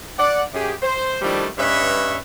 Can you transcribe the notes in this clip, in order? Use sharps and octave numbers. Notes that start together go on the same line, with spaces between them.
D5 F#5
F#2 G4 G#4
C5
D#3 F3 G3 A3 D4 E4
G2 C#4 B4 C#5 D#5 E5